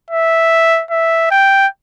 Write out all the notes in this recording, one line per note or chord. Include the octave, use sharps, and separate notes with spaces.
E5
E5
G5